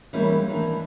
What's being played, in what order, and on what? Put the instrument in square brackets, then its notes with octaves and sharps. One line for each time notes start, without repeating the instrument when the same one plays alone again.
[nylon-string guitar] E3 G3 G#3 A#3 C#4 D#4
D#3 E3 A#3 D4